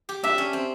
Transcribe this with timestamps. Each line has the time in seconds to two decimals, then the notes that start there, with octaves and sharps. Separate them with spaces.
0.09 G4
0.24 D4 E5
0.38 C#4
0.53 C4